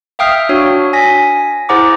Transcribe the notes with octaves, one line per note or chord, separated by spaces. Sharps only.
E5 F5 G5 D#6 F6 C7
D4 F#4 C#5
G#5 A#6 B6
E4 G#4 C5 F#5 A#5 D6